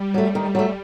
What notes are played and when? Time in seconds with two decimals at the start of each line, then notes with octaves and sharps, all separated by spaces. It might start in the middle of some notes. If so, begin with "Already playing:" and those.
Already playing: G3
0.14 F#3 A3
0.35 D#3
0.55 F#3 A3